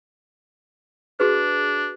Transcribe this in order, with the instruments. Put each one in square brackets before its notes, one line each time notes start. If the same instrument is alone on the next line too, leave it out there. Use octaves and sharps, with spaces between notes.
[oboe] D4 [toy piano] F#4 G#4 B4